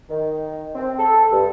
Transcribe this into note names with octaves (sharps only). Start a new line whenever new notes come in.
D#3
C4
A4
G2